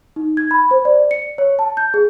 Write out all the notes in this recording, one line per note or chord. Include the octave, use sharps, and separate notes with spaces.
D#4
G#6
B5
C5
D5
C#7
C#5
A5
G6
G#4